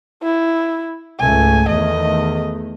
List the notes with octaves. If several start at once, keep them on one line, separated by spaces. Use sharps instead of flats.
E4
C#2 G#2 A3 G#5
E2 D#3 A3 D#5